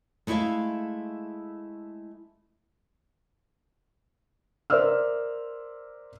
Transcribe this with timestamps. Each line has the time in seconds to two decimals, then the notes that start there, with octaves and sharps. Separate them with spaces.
0.27 G#3 A3 E4 D5 E5 F5
4.70 A#4 C5 D5 E5 E6 F6